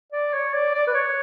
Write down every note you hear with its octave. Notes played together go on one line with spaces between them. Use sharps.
D5
C#5
D5
D5
B4
C#5